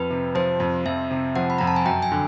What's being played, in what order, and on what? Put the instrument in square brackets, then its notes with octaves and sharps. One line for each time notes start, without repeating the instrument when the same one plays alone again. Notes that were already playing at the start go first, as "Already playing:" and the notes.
Already playing: [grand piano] F2 [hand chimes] B4
[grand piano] C3
[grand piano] F3 [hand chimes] C5
[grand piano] F2
[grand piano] F2 [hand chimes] E5
[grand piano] C3
[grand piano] F3 [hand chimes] F#5
[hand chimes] B5
[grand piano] F2 [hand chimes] A#5
[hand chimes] A5
G#5
[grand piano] F#2 [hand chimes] G5
[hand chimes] G#5
[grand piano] D3